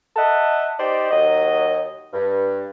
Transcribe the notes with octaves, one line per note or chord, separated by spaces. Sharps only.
D#5 E5 F#5 A5
D#4 G4 C5 D5
D#2 F#3 D#5
G2